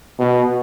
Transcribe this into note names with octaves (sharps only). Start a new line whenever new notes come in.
B2